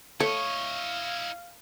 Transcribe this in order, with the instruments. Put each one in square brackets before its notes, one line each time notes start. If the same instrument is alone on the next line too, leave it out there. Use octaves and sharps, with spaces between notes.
[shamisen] A3 [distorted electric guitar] E4 D#5 [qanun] C#5 [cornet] F5